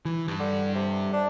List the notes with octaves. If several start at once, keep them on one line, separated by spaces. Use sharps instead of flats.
E3
G2
D3
C3
D4